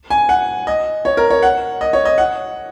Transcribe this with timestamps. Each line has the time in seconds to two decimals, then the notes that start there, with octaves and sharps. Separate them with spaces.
0.10 G#5
0.29 F#5
0.67 D#5
1.05 C#5
1.17 A#4
1.30 C#5
1.43 F#5
1.81 D#5
1.93 C#5
2.05 D#5
2.18 F#5